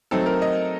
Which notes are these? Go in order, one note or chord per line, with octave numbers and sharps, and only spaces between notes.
F#3 A3 C4 D#4 A4
A#4
D#5